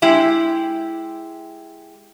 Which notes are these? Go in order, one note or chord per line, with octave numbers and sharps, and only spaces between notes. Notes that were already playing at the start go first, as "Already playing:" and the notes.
G#3 E4 G4